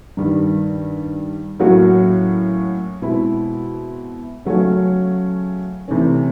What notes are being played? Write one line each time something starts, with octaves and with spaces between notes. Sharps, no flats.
G2 D#3 G3
A2 F#3 A#3 C#4 F#4
B2 G#3 C4 E4
C#3 F#3 A3 C#4
C3 E3 A3 C#4